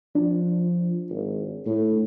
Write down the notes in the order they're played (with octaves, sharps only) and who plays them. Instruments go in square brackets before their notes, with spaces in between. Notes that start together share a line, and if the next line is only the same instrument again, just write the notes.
[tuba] F3 [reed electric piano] D4
[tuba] G#1
A2